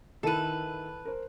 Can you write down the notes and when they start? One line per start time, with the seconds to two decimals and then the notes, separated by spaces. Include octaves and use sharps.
0.23 D#3 E4 A4 B4 D#7
1.05 A#4 C5